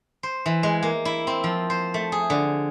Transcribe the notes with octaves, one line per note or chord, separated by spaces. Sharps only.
C5
E3
G#3
A#3
E4
C4
F3
C5
A3
G#4
D3